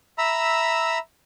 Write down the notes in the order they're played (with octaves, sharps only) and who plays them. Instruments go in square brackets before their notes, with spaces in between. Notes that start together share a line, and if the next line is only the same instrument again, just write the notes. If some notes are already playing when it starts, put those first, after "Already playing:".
[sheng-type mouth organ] E5 A#5 B5 E6